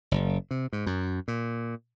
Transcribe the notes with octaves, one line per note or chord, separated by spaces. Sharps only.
F#1
C3
G#2
F#2
A#2